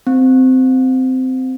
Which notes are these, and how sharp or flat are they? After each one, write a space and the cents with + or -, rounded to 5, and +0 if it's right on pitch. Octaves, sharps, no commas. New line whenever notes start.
C4 -15